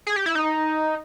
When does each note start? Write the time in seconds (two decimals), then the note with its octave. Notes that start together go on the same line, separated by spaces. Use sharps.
0.07 G#4
0.16 G4
0.26 E4
0.35 D#4